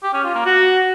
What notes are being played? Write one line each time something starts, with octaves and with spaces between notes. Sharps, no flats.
G4
C#4
F4
A#3
F#4